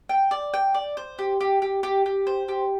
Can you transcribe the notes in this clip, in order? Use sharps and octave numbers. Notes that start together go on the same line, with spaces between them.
G5
D5
G5
D5
C5
G4
G4
G4
G4
G4
C5
G4